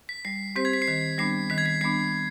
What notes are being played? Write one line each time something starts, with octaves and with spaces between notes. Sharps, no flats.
B6
G3 C7
C4 G4 C5 B6
G#6
B6
C7
D#3 B6
G3 B3 D4 C7
D#3 B6
G#6
B6
G3 B3 D4 C7